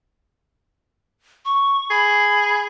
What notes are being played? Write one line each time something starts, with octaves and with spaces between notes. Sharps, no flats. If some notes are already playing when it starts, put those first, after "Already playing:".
C#6
G#4 B5